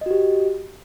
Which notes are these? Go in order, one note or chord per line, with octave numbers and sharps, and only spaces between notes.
F#4 G4 D#5